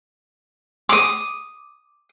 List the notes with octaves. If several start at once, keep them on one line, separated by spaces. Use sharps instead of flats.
D6 D#6